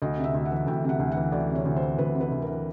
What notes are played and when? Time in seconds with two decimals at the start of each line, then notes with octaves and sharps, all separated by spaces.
0.02 D2 D#5
0.18 C3
0.24 E5
0.34 D2
0.45 F#5
0.51 E3
0.67 D2 G5
0.84 C3 F#5
0.99 D2
1.12 E3 F#5
1.32 D2 D5
1.49 C3
1.55 C#5
1.65 D2
1.76 C5
1.82 E3
1.98 D2 B4
2.15 C3
2.20 B4
2.32 D2
2.42 A#4
2.48 E3